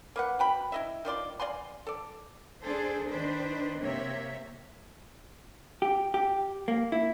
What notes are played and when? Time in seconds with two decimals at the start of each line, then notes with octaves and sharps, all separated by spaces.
0.16 A#3 B4 F#5
0.39 F#4 G5 B5
0.72 E4 D#5 E5
1.05 D#3 F4 D5 C6
1.40 D5 F5 G#5 C6
1.87 A4 D5
2.62 D4 G#4 A4 C5
3.08 D#3 D4 B4 C5
3.80 C3 A#3 C#5 E5
5.82 G4
6.14 G4
6.68 A#3
6.92 E4